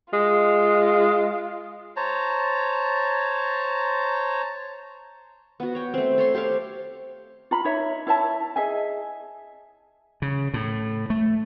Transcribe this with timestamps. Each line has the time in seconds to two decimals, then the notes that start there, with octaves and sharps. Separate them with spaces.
0.13 G#3 F4
1.96 C5 C#5 A5 A#5
5.60 B3 F#4
5.75 C#5 G5
5.94 A3 C4
6.18 A4 C#5 C6
6.34 G4 C5 C#5 F5
7.51 F4 A#5 B5
7.65 D#4 C#5 E5
8.07 E4 C#5 E5 A5
8.56 G#4 D#5 E5 G#5
10.22 C#3
10.54 A2
11.10 A3